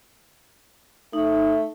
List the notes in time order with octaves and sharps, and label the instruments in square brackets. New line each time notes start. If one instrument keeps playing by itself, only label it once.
[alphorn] A3 [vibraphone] D#4